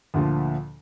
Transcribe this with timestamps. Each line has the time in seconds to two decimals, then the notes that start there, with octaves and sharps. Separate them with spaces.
0.14 D2 A#2 D3 F3